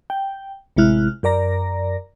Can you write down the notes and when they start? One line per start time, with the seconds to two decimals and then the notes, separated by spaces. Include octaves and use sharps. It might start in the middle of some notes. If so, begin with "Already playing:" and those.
0.10 G5
0.76 A1 C3 G#3 E4 F6 F#6
1.23 F#2 A#4 D5 A#5 A#6